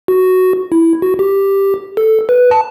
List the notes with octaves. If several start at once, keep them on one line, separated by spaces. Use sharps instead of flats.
F#4
E4
F#4
G4
A4
B4
A5